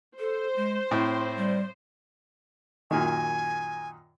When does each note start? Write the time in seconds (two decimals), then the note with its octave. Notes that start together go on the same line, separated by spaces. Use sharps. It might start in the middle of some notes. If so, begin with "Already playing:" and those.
0.19 A4 C5
0.56 G#3
0.91 A2 C4 E4
1.36 G3
2.91 F#2 A#2 D#3 G#5